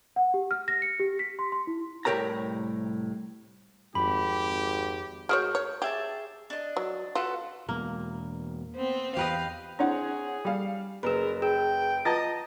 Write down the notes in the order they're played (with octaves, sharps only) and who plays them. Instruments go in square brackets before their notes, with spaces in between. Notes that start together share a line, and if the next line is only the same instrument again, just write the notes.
[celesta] F#5
G4
F6
A#6
C#7
G4
B6
C6
C6
E4
[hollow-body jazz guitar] C2 A2 G4 A#4 C#5 A#5
[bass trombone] G#1 [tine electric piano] F2 [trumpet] G4 [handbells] B5
[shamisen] G#3 F#4 C#5 [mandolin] A#4 G6
[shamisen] C#5
[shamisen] G4 [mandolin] G#4 E5 A5
[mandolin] D4 D#5
[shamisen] F#3
[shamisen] F4 [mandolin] F#4 A4 B4
[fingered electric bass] E2 B2 [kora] A#3
[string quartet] B3 C4
[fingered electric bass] E2 [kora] G4 B4 D#5 [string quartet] F5
[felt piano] C4 C#5 F#5 [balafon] D4 E4 [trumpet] G#4
[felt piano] G3 F5
[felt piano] F#1 B4 [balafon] G#4 B5 [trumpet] A#4
[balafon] G#4 [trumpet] G5
[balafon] F4 B4 [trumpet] D#5 [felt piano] A5 A#5 A6